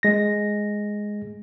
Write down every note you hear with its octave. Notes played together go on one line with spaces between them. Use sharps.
G#3 A#6